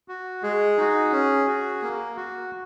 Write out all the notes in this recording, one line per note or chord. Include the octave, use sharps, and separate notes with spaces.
F#4
G#3 G#4
D#4 F#4
C#4
F#4
A#3
F#4